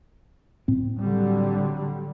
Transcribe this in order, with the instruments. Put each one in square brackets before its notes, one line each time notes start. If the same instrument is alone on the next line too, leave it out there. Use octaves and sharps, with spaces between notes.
[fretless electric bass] A2 C4
[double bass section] D3 F#3 G3